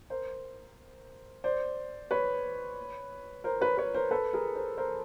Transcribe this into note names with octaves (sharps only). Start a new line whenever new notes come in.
A#4 C5
C5 D5
B4 C#5
A#4 C5
B4 C#5
B4 C#5
A#4 C5
A4 B4
G#4 A#4
A#4 C5
A#4 C5